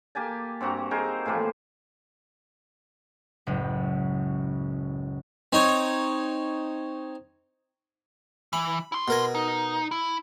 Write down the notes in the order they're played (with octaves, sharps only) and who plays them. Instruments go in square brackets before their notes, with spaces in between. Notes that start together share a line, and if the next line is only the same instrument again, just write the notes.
[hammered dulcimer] A#3 G4 G#5 A5
G2 C4 F#4 A#5
D#4 G#4 A#4 C5
A2 E3 F3 A#3
[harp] F#1 C#2 A2
[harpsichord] C4 D#4 C#5
[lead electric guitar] E3 [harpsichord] B5
[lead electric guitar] E4 C6
[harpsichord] B2 A#4 G#5
[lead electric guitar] D#4
E4